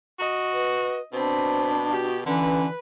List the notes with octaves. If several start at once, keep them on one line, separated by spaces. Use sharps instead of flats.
F#4 D#5
B4
B2 C4 D4 C5 B5
F#4 G4
D3 E3 C#4 B4